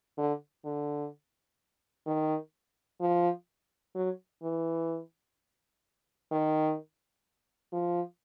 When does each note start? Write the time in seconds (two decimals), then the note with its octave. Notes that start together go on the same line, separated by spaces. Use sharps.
0.18 D3
0.65 D3
2.07 D#3
3.01 F3
3.95 F#3
4.43 E3
6.32 D#3
7.73 F3